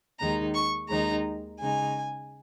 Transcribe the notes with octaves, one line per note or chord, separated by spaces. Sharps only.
D#2 D#3 G#3 D#4 A#5
C#6
D#2 D#3 G#3 D#4 A#5
C#3 G#3 D#4 G#5